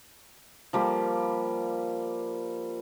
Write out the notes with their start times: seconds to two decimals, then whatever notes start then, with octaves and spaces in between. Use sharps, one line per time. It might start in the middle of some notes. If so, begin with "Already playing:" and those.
0.73 F3 G3 A#3